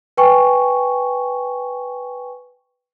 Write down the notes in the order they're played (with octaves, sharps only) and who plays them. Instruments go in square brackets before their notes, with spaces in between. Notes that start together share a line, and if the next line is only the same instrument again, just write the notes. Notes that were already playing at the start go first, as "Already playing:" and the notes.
[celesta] B4 G5 G#5 C#6